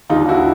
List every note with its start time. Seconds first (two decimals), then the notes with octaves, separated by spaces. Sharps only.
0.10 D#2 D3 G3 D#4 F4
0.29 E4 F#4